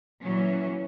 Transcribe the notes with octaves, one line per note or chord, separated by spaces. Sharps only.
A#2 E3 F#3 C#4